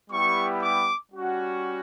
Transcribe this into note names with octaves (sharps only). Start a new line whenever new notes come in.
G3 B3 E4 G4 C#6
D6
G3 C#4 F#4